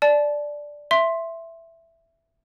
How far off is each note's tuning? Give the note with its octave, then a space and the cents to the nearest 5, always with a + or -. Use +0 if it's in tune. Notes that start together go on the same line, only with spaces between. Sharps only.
D5 +0 A5 -30
E5 +10 C6 +10